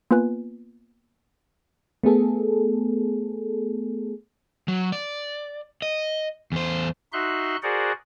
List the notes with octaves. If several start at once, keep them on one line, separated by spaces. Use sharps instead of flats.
A#3 B3 F4 B4 G#5 F#6
A3 B3 G#4 A4
F#3
D5
D#5
E2 C5
D#4 F#4 E5 C6 F#6
F#4 G#4 A#4 C5 D5 F#5